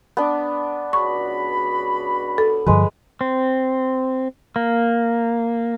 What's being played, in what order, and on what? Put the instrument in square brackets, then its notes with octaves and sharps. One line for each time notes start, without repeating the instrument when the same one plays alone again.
[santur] B3 D4
[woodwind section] C#2 F#4 B5 [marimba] C#6
[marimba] A4
[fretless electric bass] G2 D3 F3 [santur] G#3 B4
[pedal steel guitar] C4
A#3